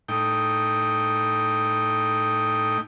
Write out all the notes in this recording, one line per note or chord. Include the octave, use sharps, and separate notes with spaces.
A2 D#4 G5